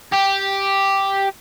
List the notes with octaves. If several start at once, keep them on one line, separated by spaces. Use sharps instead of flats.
G4